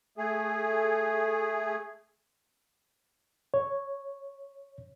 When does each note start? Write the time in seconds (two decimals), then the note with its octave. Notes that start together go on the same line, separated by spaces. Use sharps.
0.18 A3 G#4
3.54 C#5